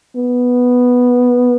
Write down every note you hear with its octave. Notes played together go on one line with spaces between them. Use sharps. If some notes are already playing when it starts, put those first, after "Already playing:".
B3